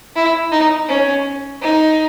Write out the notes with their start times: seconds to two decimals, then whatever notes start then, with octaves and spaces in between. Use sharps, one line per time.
0.16 E4
0.52 D#4
0.89 C#4
1.62 D#4